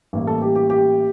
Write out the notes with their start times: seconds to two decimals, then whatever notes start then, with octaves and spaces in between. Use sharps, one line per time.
0.13 A1 A2 G3 A#3
0.27 A4
0.41 G4
0.55 G4
0.70 G4